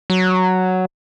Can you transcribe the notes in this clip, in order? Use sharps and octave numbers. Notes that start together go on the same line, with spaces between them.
F#3